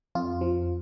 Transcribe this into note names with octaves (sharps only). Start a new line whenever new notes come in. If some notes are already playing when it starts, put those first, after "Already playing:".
F2 F4
F3